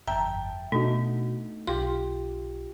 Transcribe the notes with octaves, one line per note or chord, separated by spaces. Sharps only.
G1 F2 E5 G5 A5 A#5
B2 A3 D4 D#4 F#4
B1 F4 G4 C6